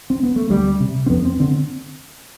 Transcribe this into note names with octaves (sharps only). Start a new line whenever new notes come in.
C4
B3
A3
D2 G3
C3
C4
F2 B3
C4
D3 C4